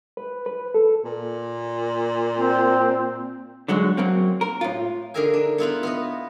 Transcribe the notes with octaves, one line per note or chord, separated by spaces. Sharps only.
B4
B4
A4
A#2
C4
D3 F#3 G#3 F#4
F#2 F#3 A#3 C4
A#4
A2 F4
D3 D#4 G#4 A#4 E5 G#5
D4
B3 E4 F4 B4
B3 B4 D#5